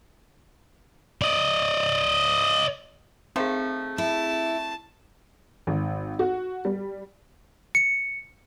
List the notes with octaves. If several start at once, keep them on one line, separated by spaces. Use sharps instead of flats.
D5 D#5
D#3 A3 C4 G#4 C5
E4 A5
G#1
F#4
G3
C#7